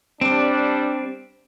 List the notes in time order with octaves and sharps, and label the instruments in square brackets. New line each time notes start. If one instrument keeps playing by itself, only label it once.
[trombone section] G3 D4 [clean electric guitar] C4